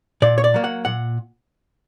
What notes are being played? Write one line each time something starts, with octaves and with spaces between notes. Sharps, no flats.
A#2 D5
C#5
D5
F#3 A#3
F#5
A#2 F#5